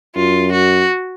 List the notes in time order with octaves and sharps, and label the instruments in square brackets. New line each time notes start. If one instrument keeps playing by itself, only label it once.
[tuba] F#2 [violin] F4
[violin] F#4